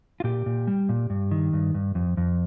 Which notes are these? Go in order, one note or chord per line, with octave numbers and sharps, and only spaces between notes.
F4
A#2 G4
A#2
G3
A#2
G2
D#3
G2
G2
F2
F2